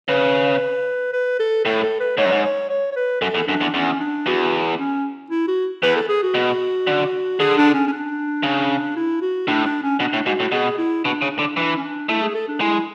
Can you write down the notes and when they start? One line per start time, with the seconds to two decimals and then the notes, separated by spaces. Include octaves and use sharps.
0.08 C#3 B4
1.13 B4
1.39 A4
1.65 A2 A4
1.83 A4
2.00 B4
2.17 G#2 C#5
2.25 F#2
2.32 G#2
2.44 C#5
2.70 C#5
2.92 C#5
2.96 B4
3.21 F#2 A4
3.35 E2
3.47 F#2 D4
3.61 E2
3.74 E2 C#4
4.00 D4
4.27 E2 F#4
4.79 C#4
5.30 E4
5.47 F#4
5.83 E2 B4
5.96 A4
6.08 G#4
6.22 F#4
6.34 B2
6.87 D3
7.40 D3 G#4
7.57 D4
7.74 C#4
7.87 C#4
7.92 D4
8.43 C#3
8.96 E4
9.21 F#4
9.48 A2 D4
9.65 D4
9.83 C#4
10.00 B2 D4
10.13 A2
10.26 G#2 F#4
10.40 A2
10.52 B2 G#4
10.78 E4
11.04 B2 D4
11.22 C#3
11.31 D4
11.39 D3
11.56 E3 D4
11.77 C#4
11.83 D4
12.09 A3 E4
12.21 G#4
12.35 A4
12.48 D4
12.61 G#3 E4